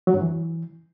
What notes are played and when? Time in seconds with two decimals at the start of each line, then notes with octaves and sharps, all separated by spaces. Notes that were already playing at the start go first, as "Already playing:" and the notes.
0.07 F#3
0.14 G2
0.21 E3